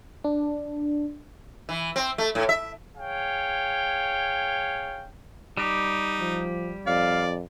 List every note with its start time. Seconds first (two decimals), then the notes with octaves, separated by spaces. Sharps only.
0.24 D4
1.69 E3
1.96 C4
2.18 A3
2.35 A2
2.49 E5
2.96 G#4 C#5 F5 G5
5.57 G3 D#4 G4
6.20 F3
6.87 F2 D5 F5